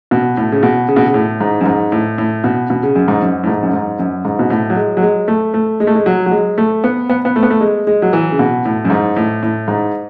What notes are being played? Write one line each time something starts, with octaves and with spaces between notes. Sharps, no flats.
B2
A2
C#3
B2
C#3
B2
C#3
A2
G#2
F#2
G#2
A2
A2
B2
B2
C#3
F#2
G#2
F#2
A2
G#2
F#2
G#2
F#2
G#2
B2
A2
F#3
G#3
F#3
G#3
A3
A3
G#3
A3
G#3
F#3
F#3
G#3
A3
B3
B3
B3
A3
B3
A3
G#3
G#3
F#3
E3
C#3
B2
A2
F#2
G#2
A2
A2
G#2